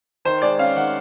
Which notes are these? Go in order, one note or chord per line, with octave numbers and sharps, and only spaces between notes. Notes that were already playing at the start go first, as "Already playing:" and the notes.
D#3 C5
G#3 D5
C#4 F5
D#3 F#5